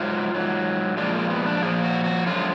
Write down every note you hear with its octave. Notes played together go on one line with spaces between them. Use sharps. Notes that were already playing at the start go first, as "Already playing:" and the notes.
Already playing: G#2 F#3 F4
G#2 F#3
A#2 F3 G#3 D4
A#3
B3
D4
A#2 F3 G#4
F#4
F#4
F#2 D3 F3 G#3 F4